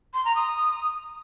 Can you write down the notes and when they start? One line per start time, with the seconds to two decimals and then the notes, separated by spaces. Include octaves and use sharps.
0.14 C6
0.25 A#5
0.36 D#6